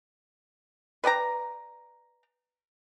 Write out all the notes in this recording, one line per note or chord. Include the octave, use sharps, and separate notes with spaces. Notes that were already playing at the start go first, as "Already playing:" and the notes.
B4 D5 G5 A#5